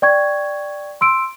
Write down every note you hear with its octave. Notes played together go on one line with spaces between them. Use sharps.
D5 G5 C#6 G#6
C6 E6 D7